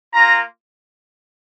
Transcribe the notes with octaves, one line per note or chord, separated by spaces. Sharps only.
A#3 F4 A#5